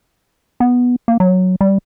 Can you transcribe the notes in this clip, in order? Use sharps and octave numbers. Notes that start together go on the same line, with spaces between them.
B3
A#3
F#3
G3